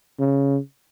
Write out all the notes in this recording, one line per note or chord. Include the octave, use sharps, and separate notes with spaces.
C#3